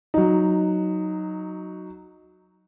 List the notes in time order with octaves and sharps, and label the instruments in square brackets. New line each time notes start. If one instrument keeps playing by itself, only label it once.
[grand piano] F#3 D#4